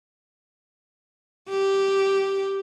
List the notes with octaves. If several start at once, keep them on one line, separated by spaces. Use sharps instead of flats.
G4